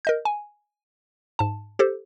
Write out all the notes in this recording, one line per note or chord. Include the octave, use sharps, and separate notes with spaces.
A#4 D#5 G6
G#5
G#2 A5
G4 A4 C5